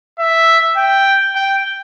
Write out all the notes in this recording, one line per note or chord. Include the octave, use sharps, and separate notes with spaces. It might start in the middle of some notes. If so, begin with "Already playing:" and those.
E5
G5
G5